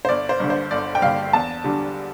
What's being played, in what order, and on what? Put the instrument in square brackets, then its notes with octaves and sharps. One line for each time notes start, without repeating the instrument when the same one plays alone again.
[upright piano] C5
G1 D5
C5
G2 D3
C5
G1 D5
G5
G2 D3 F5
E2 A5
D3 G3 D4